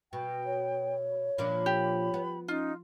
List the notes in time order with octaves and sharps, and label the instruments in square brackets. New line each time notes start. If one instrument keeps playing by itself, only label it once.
[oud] B2 [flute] G5
[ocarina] C#5
[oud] A#2 F3 D4 [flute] B5
[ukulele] G4
[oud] B3
[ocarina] C#4 [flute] D#4 [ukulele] F4